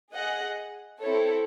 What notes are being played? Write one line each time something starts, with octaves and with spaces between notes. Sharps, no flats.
G#4 D#5 F#5
C4 E4 A4 C#5